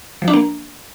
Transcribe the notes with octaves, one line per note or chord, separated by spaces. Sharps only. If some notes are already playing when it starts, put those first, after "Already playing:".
F3
D4
A#3